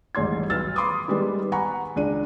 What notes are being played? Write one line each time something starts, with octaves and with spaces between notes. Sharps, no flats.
D#1 A1 G#2 C#5 C6 G#6
B1 B4 E6 F6 A6
B5 C6 D6 D#6
D#3 G3 G#3 B3
F#5 G#5 A#5 B5 C#6
C#2 D4 D#7